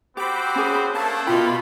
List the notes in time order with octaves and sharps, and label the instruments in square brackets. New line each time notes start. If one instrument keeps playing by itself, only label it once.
[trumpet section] C4 F#4 C5 [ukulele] G4 [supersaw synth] B5 D6
[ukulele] C#4 G#4
[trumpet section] A3 A#3 D4 [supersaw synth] A5
[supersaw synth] B2 B5 [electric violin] F4 [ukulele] D#5 G5